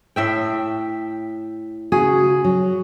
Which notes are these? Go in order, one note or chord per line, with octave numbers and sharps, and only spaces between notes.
A2 E5 G5
C#3 F#4 G#4
F#3